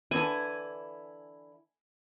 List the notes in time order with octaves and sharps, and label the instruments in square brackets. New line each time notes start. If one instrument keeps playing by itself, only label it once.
[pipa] D3 E3 E4 [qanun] G#5